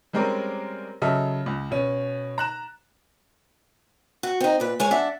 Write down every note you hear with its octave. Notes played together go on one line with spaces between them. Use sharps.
G3 G#3 C4 C#4 A#4 D5
C#3 F#3 A4 D#5 E5 F6
C#2
B2 C#4
A#5 F#6 E7
F#4
C4 D#4
A#2 B4
G#3 C#5 G#5
D4 E5 F#5